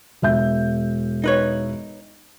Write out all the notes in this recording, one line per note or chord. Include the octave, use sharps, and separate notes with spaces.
E1 E5 G6
D#4 B4 C#5